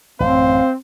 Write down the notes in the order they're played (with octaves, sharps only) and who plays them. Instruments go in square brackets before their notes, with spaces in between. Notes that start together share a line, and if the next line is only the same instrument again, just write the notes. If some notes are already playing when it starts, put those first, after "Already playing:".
[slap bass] A1 F#2 [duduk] C4 [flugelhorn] C5 [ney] F5